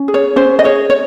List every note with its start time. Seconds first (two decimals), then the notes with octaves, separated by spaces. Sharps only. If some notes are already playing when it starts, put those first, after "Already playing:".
Already playing: C#4
0.08 G#4
0.14 C#5
0.36 C#4 C5
0.59 D#5
0.64 G#4 C#5
0.90 C#5